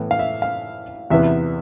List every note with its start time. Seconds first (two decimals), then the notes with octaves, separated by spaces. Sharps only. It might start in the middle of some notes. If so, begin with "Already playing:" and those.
Already playing: A2 E3 B3
0.11 F5
0.19 E5
0.42 F5
1.10 E2 C3 E3 B3 E5